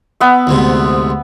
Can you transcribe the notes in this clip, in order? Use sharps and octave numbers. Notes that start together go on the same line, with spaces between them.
B3 E5
D2 G#2 C3